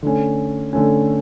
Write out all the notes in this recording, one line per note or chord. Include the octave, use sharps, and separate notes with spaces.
D3 A3 C#4
D3 A3 C#4